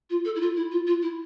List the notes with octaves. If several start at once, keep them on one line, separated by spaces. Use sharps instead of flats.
F4
A4
E4
F4
E4
F4
F4
E4